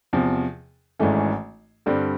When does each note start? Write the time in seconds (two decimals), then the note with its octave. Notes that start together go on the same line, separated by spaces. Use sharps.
0.13 E2 C3 F3
0.99 G#1 G#2 E3 A3 C#4
1.86 G2 D3 G3 C4